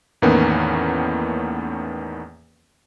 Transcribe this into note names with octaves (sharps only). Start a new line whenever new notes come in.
E2 A2 D#3 A#3 B3 C#4